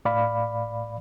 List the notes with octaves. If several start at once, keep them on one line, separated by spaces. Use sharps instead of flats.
A2 D5 F5 B5